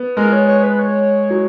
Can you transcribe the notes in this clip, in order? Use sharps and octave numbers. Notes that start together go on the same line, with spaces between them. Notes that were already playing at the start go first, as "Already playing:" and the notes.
Already playing: B3
G#3 A#4
C#5
C#5
B4
C#5
F#3